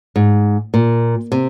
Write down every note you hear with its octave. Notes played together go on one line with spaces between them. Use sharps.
G#2
A#2
C3